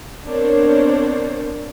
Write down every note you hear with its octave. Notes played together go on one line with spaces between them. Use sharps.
B3 C4 D4 A#4 C5 C#5